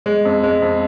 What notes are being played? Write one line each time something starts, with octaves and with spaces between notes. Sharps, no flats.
G#3
F2
G#3
F2